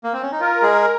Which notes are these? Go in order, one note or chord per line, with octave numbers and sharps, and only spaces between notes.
A#3
C4
C#4
D#4
F4 A#4
G#3 G#4